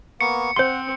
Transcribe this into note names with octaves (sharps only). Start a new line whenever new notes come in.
A#3 B3 C#6 C#7
C4 C5 F#5 C6